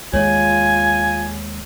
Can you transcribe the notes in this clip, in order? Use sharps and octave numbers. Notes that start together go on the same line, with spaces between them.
D#2 G#3 F4 C#5 G#5